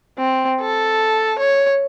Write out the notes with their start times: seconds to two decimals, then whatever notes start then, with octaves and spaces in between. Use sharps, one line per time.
0.18 C4
0.60 A4
1.39 C#5